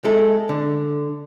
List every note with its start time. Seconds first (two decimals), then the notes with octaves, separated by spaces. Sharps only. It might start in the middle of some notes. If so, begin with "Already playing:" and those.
0.04 G#3 E4 A4
0.49 D3